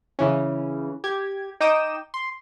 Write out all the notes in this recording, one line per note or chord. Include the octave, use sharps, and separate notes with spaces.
C#3 E3 C#4
G4 G#6
D#4 G5 D6 D#6 E7
C6